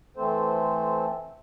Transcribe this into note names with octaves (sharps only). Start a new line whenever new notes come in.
E3 A3 C4 A4 C5